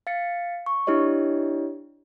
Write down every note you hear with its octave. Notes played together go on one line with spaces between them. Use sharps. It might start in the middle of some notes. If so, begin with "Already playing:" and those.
F5 A6 C#7
C#6
D4 E4 G4 C#5 D#5